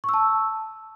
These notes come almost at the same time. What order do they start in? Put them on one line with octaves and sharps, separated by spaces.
C#6 E6 A5